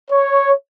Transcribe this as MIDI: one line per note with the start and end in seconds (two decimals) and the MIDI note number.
0.11 0.51 73